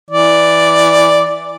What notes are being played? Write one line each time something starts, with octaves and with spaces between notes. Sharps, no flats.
E3 D5